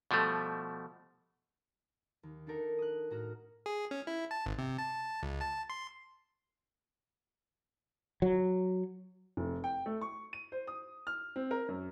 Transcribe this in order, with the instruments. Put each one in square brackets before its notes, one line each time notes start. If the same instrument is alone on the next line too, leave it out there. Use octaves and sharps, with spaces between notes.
[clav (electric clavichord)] B2 F3 G3 A3
[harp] D#2
D4 D#4 A4 A#4 F#5
D#6 F#6
A2 F#4 A#5 F6
[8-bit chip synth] G#4
C#4
E4
A5
G#1
C3
A5
C#2
A5
C6
[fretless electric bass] F#3
[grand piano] F1
G5
A3
C#6
D#7
C5
D#6
F6
C4
A#4
F#2